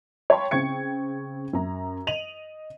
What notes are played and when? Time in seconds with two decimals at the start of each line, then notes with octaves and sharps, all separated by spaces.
0.30 C#5 F5 G5 A5 B5 C6
0.51 C#3 C4 G5 C#6 G#6 C#7
1.53 F#2 A#5
2.07 D#5 D#7 F7 F#7